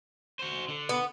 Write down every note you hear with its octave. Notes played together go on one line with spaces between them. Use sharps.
F#4 C5
D3
B3